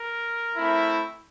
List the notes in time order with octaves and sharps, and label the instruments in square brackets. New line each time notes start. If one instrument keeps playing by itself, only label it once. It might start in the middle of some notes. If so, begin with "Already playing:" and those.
Already playing: [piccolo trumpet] A#4
[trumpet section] A3 C4 E4